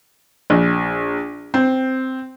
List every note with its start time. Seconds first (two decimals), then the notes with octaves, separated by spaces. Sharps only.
0.50 A#1
1.54 C4